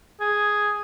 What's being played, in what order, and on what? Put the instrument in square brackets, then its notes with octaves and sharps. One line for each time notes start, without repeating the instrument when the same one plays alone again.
[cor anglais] G#4